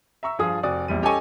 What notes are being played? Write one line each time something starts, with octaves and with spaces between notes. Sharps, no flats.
E5 A#5 C#6 E6
G2 F3 F4 G#4 D#6
F1 F#4 D5 D#6
A#1 E2 G3 D#7
C#4 G4 A4 D#5 G#5 C#6